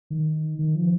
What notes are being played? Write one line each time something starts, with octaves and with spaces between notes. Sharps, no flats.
D#3
D#3
F3